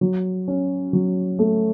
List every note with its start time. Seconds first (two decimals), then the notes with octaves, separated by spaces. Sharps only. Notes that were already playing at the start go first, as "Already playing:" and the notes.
0.01 F#3
0.48 C#4
0.93 F#3
1.39 A3